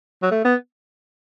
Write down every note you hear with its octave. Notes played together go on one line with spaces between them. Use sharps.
F#3
A3
B3